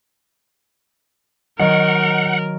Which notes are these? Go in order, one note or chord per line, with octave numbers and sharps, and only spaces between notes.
D#3 F#3 A#4 D#5 F#5